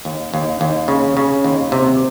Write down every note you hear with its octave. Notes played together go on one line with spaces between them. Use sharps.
D#2
D#2
D#2
C#3
C#3
D#2
C3